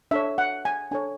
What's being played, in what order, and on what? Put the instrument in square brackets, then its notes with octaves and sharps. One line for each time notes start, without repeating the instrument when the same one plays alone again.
[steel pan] D4 A4 C#5 E5
F#5
G#5
D4 A4 C#5 G#5